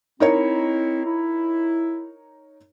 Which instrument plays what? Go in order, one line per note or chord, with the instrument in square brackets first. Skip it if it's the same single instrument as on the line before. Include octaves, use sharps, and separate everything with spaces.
[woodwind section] C4 E4 [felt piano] D#4 A#4 C#5
[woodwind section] E4